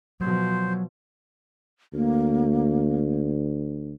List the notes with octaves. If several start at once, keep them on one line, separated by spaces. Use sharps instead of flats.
B2 F3 F#3 C5
D2 A#3